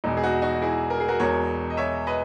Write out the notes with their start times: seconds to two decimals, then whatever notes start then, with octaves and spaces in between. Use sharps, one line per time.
0.04 E1 E2 B2 D#4
0.17 G#4
0.23 D#4 F#4
0.42 D#4 F#4
0.62 E4 G#4
0.90 A#4
1.00 G#4
1.08 F#4 A#4
1.20 E1 E2 B2 A#4 C#5
1.70 D#5
1.77 C#5 E5
2.07 B4 D#5